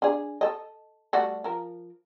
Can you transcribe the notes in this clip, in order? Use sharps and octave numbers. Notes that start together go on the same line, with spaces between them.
D4 G#4
A4 D#5
G3 A3 F#4
F3 A#4